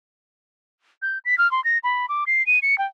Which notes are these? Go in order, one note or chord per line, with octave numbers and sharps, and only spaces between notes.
G6
B6
F6
C6
A#6
B5
D6
C7
D#7
C#7
G5